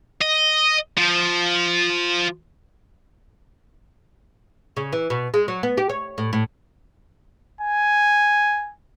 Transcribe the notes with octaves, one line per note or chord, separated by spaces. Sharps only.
D#5
F3
C#3
E3
B2
G#3
F#3
B3
G4
C#5
A2
A2
G#5